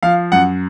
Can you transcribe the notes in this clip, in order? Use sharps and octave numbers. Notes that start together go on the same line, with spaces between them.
F3 F5
F#2 F#5